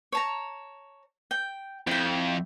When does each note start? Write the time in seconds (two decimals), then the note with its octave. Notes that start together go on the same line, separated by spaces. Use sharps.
0.12 C#5 A5 A#5
1.31 G5
1.87 F2 E4 G5